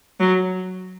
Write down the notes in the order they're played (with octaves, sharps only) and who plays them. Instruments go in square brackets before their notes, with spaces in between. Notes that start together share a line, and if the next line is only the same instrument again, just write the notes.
[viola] F#3